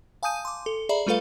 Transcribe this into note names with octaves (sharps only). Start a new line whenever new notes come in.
F5 G#5 A5 D#6 G6 D#7
C6 D6
A4
G#4 D5 E5 A#5 B5
G3 A3 F4 A4 B4 F5